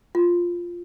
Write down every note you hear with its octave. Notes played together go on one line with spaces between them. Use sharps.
F4